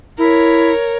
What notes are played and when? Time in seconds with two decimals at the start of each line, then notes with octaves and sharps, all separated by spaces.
0.18 E4 A#4 C#5